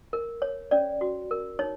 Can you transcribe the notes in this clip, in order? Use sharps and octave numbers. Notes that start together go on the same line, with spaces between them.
A#4
C#5
C#4 D5
F#4
A#4
D#4 C#5